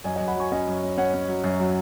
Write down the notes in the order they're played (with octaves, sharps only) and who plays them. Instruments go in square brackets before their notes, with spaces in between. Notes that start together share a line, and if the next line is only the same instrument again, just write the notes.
[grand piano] F#2 D#5 G#5
D#5 G#5
F#2
F#5 B5
F#3 G#5 C#6
C#4 D#5 G#5
F#2
C#4
C#4 C#5 F#5
C#4
F#3
F#2
F#3